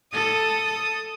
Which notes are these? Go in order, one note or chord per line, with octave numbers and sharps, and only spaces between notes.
A4 D#6